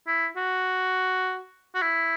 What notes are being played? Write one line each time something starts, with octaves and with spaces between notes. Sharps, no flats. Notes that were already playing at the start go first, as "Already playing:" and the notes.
E4
F#4
F#4
E4